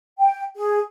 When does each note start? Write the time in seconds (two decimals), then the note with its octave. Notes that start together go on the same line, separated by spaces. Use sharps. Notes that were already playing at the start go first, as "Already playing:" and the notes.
0.18 G5
0.56 G#4